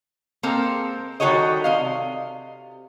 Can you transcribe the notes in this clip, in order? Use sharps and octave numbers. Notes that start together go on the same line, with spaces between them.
G#3 A#3 C4 A4 A#4 C5
D#3 G3 F#4 A4 C#5 D#5
C3 D#5 F5